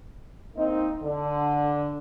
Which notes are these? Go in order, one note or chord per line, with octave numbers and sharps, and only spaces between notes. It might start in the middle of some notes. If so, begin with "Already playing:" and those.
A#3 C4 D#4
D3